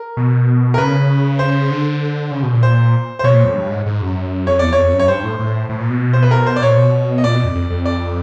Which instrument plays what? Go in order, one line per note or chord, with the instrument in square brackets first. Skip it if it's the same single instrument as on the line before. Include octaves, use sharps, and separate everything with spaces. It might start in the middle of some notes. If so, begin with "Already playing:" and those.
Already playing: [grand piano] A#4
[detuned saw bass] B2
[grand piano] A#4
[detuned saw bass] C#3 [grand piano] B4
[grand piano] C5
[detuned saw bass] D3
C#3
B2
A#2
[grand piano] C5
C5
[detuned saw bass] B2 [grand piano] C#5
[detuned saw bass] A#2
F2
G2
G#2
G#2
F#2
[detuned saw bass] F2 [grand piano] C#5
[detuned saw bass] E2 [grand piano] D5
[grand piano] C#5
[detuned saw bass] F2
F#2
[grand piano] C#5
[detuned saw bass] G2 [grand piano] C5
[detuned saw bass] A2
A2
A2
A#2
B2
[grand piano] C5
B4
A#4
C5
D5
[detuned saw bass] A#2 [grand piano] C#5
[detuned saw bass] B2
[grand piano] D#5
[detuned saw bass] A#2 [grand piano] D5
[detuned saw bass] B2
F2
F2
F2
[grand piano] D5